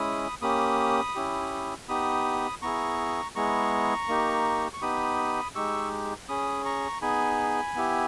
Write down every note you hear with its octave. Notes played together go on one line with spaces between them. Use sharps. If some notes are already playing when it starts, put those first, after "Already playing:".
Already playing: G#3 C#4 E4 B5 D#6
A#3 C#4 G4 B5 D#6
C#4 E4 G4
B3 D#4 G4 B5 D#6
B3 E4 G#4 A#5 C#6
G#3 B3 E4 G#4 A#5 C#6
A#3 D#4 G4
C#6
B3 D#4 G4 B5 D#6
G#3 D#4 G4 C#6 E6
C#4 G#4 B5 D#6
A#5 C#6
B3 D#4 G#4 G#5 B5
B3 E4 G4